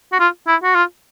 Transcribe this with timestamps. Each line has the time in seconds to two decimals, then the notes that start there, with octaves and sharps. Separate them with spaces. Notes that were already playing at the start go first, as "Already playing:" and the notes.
0.12 F#4
0.20 F4
0.47 E4
0.64 F#4
0.75 F4